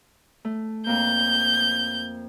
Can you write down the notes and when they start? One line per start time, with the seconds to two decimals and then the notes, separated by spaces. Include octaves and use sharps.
0.45 A3
0.86 F2 A#3 G6